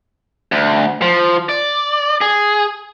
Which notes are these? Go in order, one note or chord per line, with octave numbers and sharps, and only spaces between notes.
D2
F3
D5
G#4